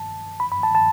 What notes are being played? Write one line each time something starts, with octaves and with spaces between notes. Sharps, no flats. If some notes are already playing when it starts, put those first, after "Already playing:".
Already playing: A5
B5
B5
A5
A5